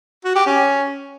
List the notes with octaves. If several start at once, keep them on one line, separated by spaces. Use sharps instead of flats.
F#4
G4
C#4